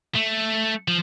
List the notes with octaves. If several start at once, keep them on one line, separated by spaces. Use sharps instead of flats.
A3
F3